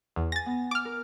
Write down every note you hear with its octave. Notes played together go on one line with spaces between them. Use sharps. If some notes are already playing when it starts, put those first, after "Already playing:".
E2
G#5 A6 A#6
B3
D6 F6
A#4